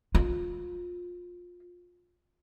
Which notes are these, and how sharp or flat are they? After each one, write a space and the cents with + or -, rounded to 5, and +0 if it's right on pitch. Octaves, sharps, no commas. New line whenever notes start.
F4 +20